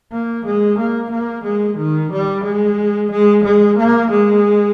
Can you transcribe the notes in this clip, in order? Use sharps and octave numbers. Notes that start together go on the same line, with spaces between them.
A#3
G#3
A#3
A#3
G#3
D#3
G3
G#3
G#3
G#3
A#3
G#3